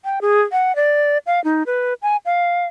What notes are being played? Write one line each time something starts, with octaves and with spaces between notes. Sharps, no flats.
G5
G#4
F#5
D5
F5
D#4
B4
G#5
F5